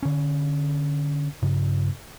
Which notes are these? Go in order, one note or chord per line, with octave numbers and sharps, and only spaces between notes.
D3 C#4
G2 C#3